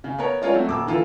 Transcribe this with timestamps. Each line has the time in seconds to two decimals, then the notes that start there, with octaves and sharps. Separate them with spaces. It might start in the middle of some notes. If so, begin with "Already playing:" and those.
0.04 C#3
0.18 B3 A#4 C#5
0.41 G#3 C#4 F4 A#4 C#5 D5
0.53 F#3 A3 C4 F#4
0.67 D#1 D6 E6
0.87 D3 E3 F4 A4 A#4